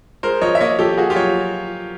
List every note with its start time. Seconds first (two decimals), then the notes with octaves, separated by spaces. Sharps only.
0.23 G#3 A#4 C5
0.42 F3 C#5 D#5
0.55 E5
0.61 A#3 C#5 D#5
0.79 F3 G4 A4
0.98 A#3 F#4 G#4
1.10 F4 G4
1.16 F#3 C#5